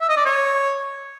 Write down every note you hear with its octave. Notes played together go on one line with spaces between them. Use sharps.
E5
D#5
D5
C#5